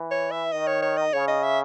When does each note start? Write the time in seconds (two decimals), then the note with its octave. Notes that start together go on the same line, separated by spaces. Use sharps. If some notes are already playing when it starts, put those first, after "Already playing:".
Already playing: E3
0.11 C#5
0.31 E5
0.52 D#3 D#5
0.67 C#5
0.82 C#5
0.97 D#5
1.13 C#3 C#5
1.28 D#5
1.43 E5